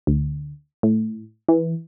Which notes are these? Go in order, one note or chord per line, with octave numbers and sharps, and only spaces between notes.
D2
A2
E3